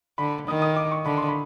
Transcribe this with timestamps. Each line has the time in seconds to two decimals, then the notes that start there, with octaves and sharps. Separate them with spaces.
0.18 D3 B5
0.47 D#3 D#6
0.62 D#6
0.76 D6
0.92 C#6
1.05 D3 B5
1.17 C6
1.28 B5